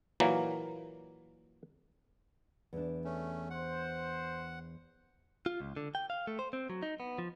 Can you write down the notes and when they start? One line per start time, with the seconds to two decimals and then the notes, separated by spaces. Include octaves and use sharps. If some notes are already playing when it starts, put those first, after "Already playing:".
0.20 A#2 E3 F#3 A#3
2.73 E2 D4
3.04 A3 C#4
3.50 C5 F#5
5.46 F4
5.60 C#2
5.76 D3
5.95 G5
6.10 F5
6.27 A3
6.39 C5
6.53 C4
6.70 F#3
6.82 D#4
7.00 B3
7.18 F3